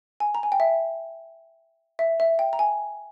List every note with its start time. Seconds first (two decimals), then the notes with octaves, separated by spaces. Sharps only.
0.20 G#5
0.35 A#5
0.43 G#5
0.52 G5
0.60 E5
1.99 E5
2.20 E5
2.39 G5
2.53 A#5
2.59 G#5